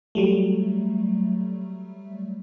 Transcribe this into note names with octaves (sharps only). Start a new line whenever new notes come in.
F#3 G3 A3